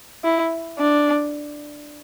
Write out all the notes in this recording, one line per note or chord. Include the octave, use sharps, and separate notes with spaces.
E4
D4